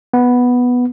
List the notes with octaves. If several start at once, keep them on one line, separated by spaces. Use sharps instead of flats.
B3